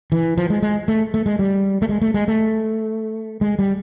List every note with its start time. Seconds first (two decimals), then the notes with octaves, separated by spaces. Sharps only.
0.12 E3
0.38 F3
0.50 G#3
0.63 G#3
0.88 A3
1.14 A3
1.26 G#3
1.39 G3
1.82 A3
1.89 G#3
2.02 A3
2.14 G#3
2.28 A3
3.41 G#3
3.59 G3